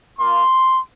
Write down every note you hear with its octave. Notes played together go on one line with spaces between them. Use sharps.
A#3 F4 C6